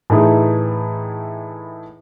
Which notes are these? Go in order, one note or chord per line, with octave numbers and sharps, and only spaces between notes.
A2 E3 A3 D#4 E4 G#4